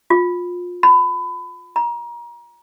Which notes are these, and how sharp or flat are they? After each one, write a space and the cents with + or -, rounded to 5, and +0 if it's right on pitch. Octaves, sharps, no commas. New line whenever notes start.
F4 +25
B5 +25
A#5 +30